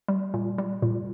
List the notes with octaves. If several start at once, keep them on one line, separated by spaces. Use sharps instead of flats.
G3
A#2
G3
A#2